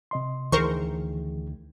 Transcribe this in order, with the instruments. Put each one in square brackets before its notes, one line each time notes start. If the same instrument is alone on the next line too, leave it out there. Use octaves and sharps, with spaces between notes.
[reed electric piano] C3 D#5 C6
[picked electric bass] D2 D#3 [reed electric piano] E3 G#4 [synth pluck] A#4 C5 C#6